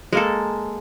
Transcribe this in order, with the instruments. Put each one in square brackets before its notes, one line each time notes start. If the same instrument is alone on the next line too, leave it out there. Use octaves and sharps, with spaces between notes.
[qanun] G#3 A#3 A4